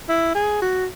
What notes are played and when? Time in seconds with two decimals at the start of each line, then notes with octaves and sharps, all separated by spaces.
0.09 E4
0.35 G#4
0.62 F#4